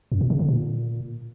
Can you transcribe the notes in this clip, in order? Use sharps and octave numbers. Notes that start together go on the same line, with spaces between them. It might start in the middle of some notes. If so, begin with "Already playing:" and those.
F#2
A#2
C#3
D3
A#2